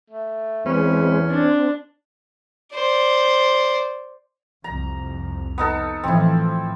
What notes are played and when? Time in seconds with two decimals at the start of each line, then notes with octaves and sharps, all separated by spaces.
0.10 A3
0.66 E2 G#3 C4 C#4 B4
1.30 C4 D4
2.74 C5 D5
4.64 C2 F2 A#5
5.58 B3 D#4 A4
6.04 A2 E3 F3 C4 E4